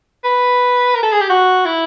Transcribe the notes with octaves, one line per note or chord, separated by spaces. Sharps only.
B4
A#4
A4
G#4
G4
F#4
E4